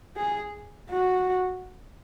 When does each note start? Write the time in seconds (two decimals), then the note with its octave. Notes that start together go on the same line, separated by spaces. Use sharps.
0.16 G#4
0.90 F#4